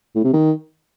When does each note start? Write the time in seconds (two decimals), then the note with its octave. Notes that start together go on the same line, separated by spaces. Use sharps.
0.15 A2
0.24 C3
0.33 D#3